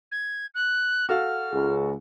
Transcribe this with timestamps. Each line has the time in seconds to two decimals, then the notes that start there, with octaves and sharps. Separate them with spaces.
0.11 G#6
0.54 F#6
1.09 F#4 A4 F5 F6
1.51 C#2 G#4